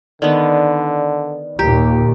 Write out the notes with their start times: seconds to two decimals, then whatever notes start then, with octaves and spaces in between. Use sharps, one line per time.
0.22 D3 D#3 B3 D5
1.59 D#2 A#2 G4 A#5 G6